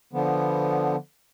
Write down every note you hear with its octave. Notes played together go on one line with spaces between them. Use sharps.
D3 F3 B3